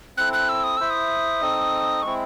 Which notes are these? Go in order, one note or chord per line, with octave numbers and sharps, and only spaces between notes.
C4 E4 A4 F#6
F#6
E6
D#6
E4 C5 E5 E6
D#6
C4 D#4 A4 D#5
G#3 C4 E4 C#6